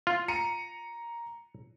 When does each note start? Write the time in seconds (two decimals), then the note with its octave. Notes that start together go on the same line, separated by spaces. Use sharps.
0.07 F4
0.28 A#5 C#7 D#7